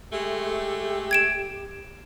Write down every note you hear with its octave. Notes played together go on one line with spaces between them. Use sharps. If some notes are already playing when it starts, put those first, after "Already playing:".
G#3 A3 G4
G#6 D7 E7